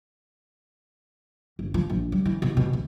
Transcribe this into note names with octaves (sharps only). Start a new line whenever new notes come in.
G1
F3
A#1
G3
E3
B2
B2
D2